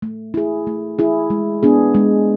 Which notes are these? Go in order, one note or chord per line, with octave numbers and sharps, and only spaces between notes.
A3
E4 G#4
A3
E4 G#4
G#3
B3 D4 G#4
G#3